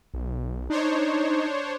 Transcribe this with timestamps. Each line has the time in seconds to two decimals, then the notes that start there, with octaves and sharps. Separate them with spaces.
0.14 B1
0.70 D4 D#4 C5 C#5